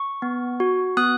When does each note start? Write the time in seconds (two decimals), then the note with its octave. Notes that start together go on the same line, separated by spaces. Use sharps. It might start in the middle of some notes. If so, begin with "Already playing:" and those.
Already playing: C#6
0.22 B3
0.60 F#4
0.97 B3 D#6 F#6